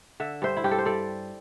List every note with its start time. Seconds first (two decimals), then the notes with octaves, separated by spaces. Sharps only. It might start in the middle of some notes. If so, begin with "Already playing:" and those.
0.20 D3 E5
0.42 G2 C5 E5
0.57 E4
0.64 G2 G4
0.71 A4
0.78 C5
0.85 G3 A4 D5